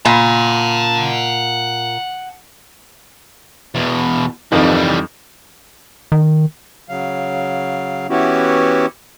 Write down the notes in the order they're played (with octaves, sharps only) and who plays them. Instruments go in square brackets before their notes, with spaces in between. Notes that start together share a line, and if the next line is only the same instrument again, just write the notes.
[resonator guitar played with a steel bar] A#2 [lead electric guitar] F#5 A5
[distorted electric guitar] E2 B2
[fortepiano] F2 D#3 [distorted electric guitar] E3 G3
[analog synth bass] D#3
[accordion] C#3 F#3 F5
E3 B3 C#4 E4 F#4 G4